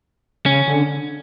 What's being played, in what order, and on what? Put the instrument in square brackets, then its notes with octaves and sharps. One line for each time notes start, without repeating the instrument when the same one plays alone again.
[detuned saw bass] C#3 [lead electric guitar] C#4
[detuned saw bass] D3